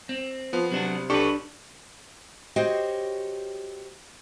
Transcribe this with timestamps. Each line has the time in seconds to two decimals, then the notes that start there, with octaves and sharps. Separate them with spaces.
0.09 C4
0.53 F3 B3
0.72 C3 F#3 D4 F#4
1.10 B1 D4 G4 A4 B4 C#6
2.56 F#4 G4 C5 C#5 D#5 G5